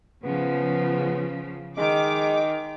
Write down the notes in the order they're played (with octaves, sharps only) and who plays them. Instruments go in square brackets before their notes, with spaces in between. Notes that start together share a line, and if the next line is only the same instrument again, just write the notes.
[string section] C#3 F3 [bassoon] B3
[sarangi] D#3 [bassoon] G#3 [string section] D6